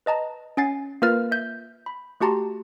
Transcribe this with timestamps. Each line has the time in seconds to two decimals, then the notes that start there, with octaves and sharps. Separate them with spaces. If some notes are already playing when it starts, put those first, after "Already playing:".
0.06 B4 D#5 A5 A#5
0.57 C#4 F#5 G#5 A6 C7
1.02 A#3 F4 A#4 B4 F6 A6
1.31 E5 G6
1.86 B5
2.21 A3 F#4 G4 A5 A#5 C6